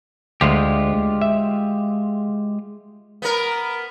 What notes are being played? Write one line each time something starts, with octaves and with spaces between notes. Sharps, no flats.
D2 G#3 F4 G4
E5
B3 A#4